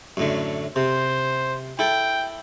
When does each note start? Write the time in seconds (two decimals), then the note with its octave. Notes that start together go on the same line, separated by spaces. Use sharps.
0.17 F#2 A2 D3
0.76 C3 C5
1.79 E4 A4 G5